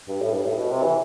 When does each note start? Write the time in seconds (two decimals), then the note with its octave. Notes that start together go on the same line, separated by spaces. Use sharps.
0.08 G2
0.21 A2
0.33 G2
0.46 A2
0.58 B2
0.70 C3
0.83 E3